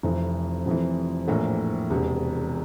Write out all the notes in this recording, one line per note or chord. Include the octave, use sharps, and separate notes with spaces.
F1 F2 E3
F1 F2 E3
A#1 A2 E3 A#3
E1 E2 C3